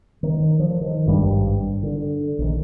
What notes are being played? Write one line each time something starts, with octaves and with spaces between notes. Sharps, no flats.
D#3
F3
D#3
G#1 G2 G3
D3
A#1 D#3